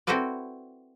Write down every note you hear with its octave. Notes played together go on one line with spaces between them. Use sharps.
C4 E4 F#4 A4 B4 D5